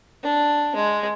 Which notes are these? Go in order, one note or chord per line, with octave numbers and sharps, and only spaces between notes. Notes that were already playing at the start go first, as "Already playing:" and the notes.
D4
G#3